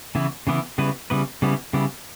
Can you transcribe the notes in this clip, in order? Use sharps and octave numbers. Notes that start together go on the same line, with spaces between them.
C#3 E3 B3 E4
C#3 E3 B3 E4
C#3 G3 B3 E4 B4
C#3 G3 B3 E4 B4
C#3 G3 B3 E4
C#3 G3 B3 E4